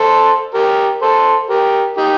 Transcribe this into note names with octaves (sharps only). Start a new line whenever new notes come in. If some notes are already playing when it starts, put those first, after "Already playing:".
Already playing: A4 C5
G4 A#4
A4 C5
G4 A#4
D#4 G4